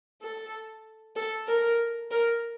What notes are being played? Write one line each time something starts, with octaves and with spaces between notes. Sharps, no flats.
A4
A4
A#4
A#4